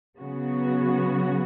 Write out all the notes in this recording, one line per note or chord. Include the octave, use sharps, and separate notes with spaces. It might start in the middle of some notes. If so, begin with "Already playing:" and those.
C#3 F#3 B3 F#4